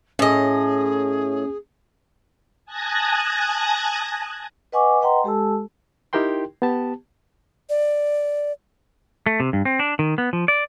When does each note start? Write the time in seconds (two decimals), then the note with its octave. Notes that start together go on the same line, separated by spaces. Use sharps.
0.19 A2 C#4 G#4 D#5 G#5
2.65 G#5 A5 D#6 F#6 G#6 A#6
4.72 B4 D#5 F#5 G#5 C#6 D6
5.01 B4 D#5 F#5 G5 A#5 C6
5.24 G#3 G4 A4 A5 E6
6.13 D#4 E4 G4 A#4 G5 C6
6.62 B3 G4 A5
7.70 D5
9.26 A3
9.40 C3
9.53 G2
9.65 C4
9.79 D4
9.99 D#3
10.18 B3
10.33 F3
10.48 D5